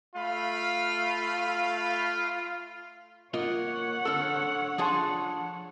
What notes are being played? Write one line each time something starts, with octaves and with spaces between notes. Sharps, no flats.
A3 F4 F5 B5
F4
A#3 F4 C#5 D#5 F#5
D3 A4 E6 F6
F3 D4 G#4 A5 C6 D#6